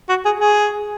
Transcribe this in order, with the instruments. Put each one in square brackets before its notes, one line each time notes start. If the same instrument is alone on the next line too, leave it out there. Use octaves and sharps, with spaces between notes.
[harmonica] F#4
G#4
G#4